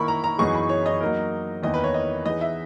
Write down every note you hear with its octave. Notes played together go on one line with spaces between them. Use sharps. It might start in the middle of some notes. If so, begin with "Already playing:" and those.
Already playing: D#3 A#3 E4 A#4 B5 C#6
A#5
A#5
F#2 E3 B3 D#4 G#4 C#6
B5
C#5
D#5
F#3 A#3 D#4 A#4
E2 D#3 A#3 E4 D#5
B4
C#5
D#5
E3 B3 D#4 G#4 B4 D#5
E5